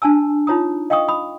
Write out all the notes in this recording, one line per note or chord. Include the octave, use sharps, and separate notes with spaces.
D4 G#5 A5 E6
D#4 F4 C#5 A#5 D#6
D#5 F5 G5 C#6 D#6
B5 D#6